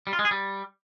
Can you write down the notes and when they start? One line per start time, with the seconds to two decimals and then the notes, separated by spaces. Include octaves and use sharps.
0.07 G3
0.13 F4
0.19 G#3
0.25 G#4
0.31 G3